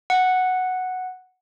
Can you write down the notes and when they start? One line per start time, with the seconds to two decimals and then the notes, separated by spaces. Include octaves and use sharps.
0.10 F#5